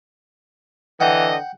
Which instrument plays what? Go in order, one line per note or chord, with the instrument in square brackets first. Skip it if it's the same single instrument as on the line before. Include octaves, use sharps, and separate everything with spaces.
[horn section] D3 E3 D#5 [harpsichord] F#5 G5